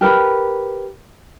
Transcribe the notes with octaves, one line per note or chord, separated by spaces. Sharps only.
G4 A#4 B4 B5